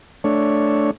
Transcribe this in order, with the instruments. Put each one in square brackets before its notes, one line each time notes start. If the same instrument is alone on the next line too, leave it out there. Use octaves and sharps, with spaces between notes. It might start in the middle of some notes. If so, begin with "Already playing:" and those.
[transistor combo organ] A3 D4 C#5